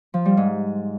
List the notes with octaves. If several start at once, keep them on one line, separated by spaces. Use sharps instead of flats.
F3
G3
G#2